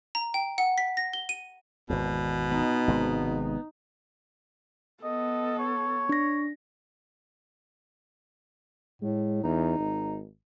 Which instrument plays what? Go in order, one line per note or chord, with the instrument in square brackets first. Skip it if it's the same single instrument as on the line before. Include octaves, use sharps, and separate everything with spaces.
[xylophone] A#5
G5
F#5
B6
A#6
G7
D#7
[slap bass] G#1 E2 [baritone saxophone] B2
[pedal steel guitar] B3 [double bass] D#4
[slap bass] G#1 C3 G#3
[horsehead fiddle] B3 A4 [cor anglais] D#5
[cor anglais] C#5
[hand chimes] D4 A#6
[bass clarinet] A2 [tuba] G#3
[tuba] E2 [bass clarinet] D#4
[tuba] G#1